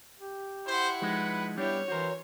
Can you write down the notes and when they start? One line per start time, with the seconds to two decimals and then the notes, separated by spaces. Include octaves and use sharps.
0.20 G4
0.67 E4 C5 F#5
1.02 F3 G#3 D#4 B4
1.57 G3 B3 D4 E4 G4 C#5
1.88 E3 F#4 A#4 C5